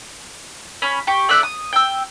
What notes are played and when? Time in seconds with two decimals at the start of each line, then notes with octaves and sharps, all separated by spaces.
0.82 C#4 B5
1.07 G4 C#6
1.29 A3 D5 E5 F#6
1.43 D#6
1.73 G5 E6